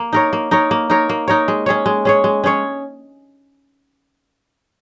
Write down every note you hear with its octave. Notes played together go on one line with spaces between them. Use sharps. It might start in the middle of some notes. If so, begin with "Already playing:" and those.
Already playing: A#3
D#4 A#4 C#5
A#3
D#4 A#4 C#5
A#3
D#4 A#4 C#5
A#3
D#4 A#4 C#5
G#3
C#4 G#4 C#5
G#3
C#4 G#4 C#5
G#3
C#4 G#4 C#5